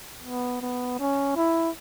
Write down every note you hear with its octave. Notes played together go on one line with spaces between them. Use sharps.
B3
B3
C#4
E4